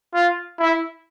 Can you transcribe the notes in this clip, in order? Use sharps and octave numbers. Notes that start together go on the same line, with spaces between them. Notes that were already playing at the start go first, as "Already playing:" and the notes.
F4
E4